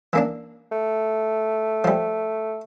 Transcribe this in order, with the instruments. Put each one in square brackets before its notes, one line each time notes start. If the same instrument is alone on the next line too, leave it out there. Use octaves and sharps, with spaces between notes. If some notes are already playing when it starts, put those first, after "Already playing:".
[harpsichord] E3 A#3 D4
[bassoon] A3
[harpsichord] F3 G3